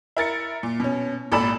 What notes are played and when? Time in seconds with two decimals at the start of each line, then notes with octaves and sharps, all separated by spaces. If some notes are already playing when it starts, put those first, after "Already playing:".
0.17 E4 A#4 A6 C#7
0.63 A#2
0.80 B2 C#4
1.32 G#1 A#2 A4 D5 B5 E7